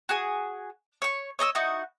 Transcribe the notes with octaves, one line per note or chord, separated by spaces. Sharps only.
F#4 G#4 G#5
C#5 C#6
C#5 D#5 A#5 E6
D#4 E4 F#4 F#5